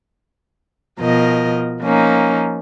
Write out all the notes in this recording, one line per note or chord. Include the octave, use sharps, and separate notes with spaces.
B2 F3 A#4 D#5
F3 A#3 C#4 D#4